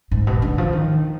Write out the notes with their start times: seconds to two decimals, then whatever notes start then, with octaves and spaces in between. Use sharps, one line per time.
0.11 G#2
0.27 B2
0.42 D3
0.58 F3
0.73 D#3